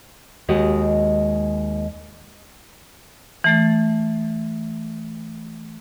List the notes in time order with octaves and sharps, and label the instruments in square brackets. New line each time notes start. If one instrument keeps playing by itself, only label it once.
[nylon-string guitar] D#2 G#3 F#4 G4 D#5
[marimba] E3 A3 A6